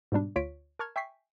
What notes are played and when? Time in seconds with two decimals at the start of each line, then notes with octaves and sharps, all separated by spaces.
0.12 G#2 B2 G3 D4
0.36 D2 F4 C#5 B6 D7
0.79 A#4 A5 C#6 F6 G#6
0.96 E5 G5 G#5 C#6 B6 C7